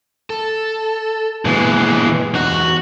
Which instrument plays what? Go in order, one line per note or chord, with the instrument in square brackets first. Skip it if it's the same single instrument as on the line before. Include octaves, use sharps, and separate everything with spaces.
[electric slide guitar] A4
[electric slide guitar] A#2 B3 [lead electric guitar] E3 G#3
[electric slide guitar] E2 D#4 [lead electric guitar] F#4